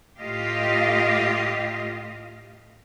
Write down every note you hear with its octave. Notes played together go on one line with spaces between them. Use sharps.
A2 A3 F4 G4 D#5 F5